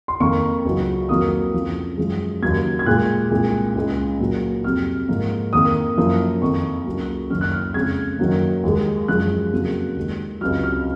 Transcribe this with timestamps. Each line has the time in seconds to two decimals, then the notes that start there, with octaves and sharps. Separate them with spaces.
0.08 C6
0.20 F2 D#3 A#3 C#6
0.65 C#2 C#3 F#3
1.09 F2 D#3 F#3 A#3 D#6
1.54 F2 C#3 F3
1.98 F#2 F3 G#3
2.42 D#2 C#3 F#3 A#3 G#6
2.79 G#6
2.86 A#2 G#3 F#6
3.31 C2 A#2 G#3
3.76 C#2 C#3 G#3
4.20 A#2 F#3 A#3
4.64 F2 C3 F#3 F6
5.09 G#2 F3 A#3
5.53 F2 D#3 A#3 D#6
5.97 F#2 F3 A#3
6.42 F2 D#3 A#3 C#6
6.86 C#2 C#3 F#3 A#3
7.30 F#2 D#3 A#3 F6
7.41 F#6
7.52 F6
7.74 F2 C#3 G#3 G#6
8.19 F#2 D#3 F#3 A#3
8.63 D#2 D#3 G#3
9.08 F#2 F3 G#3 F#6
9.53 F2 C#3 F#3 A#3
9.96 D#2 D#3 G#3
10.41 C#2 C3 F#3 F6
10.63 F6